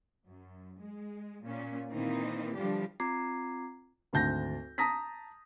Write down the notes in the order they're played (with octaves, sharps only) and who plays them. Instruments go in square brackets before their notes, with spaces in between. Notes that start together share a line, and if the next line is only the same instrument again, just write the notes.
[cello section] F#2
G#3
A#2 C#4
A#2 D#3 E3 A#3 C4 D#4
D3 E3 F3 G3 D4 G4
[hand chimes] C4 F4 A#5 D6 G#6 C7
[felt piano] G#1 D2 A5 G6 A#6
A5 A#5 D#6 A#6 B6